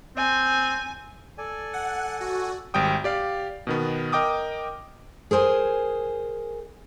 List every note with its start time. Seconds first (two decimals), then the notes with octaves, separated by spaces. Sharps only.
0.17 C4 G#5
1.38 A4 D5 G#5
1.73 F#5
2.20 F#4
2.74 G#1 G3 G5 D#6
3.04 G4 D5 F5
3.67 B2 D#3 B3
4.12 A#4 D#5 G5 D6 D#6
5.31 G#4 A#4 C5 G#5